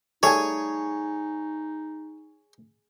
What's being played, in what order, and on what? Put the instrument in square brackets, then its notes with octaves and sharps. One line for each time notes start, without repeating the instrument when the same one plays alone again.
[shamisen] G3 A3 A4 [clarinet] D#4 [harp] G#4 G#5 [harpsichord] C#5